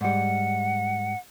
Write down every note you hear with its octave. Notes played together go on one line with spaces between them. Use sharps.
G#2 G3 F#5